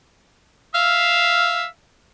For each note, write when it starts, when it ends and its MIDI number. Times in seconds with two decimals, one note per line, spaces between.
0.75 1.65 76
0.75 1.65 77